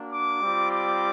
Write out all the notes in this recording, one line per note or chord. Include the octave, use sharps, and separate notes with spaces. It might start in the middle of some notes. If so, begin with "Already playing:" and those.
Already playing: A#3 D4 F#4
D6
G3 C4 F4
D6